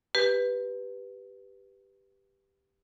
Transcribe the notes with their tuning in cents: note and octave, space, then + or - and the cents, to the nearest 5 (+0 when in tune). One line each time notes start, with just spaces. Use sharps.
G4 +0 B4 +0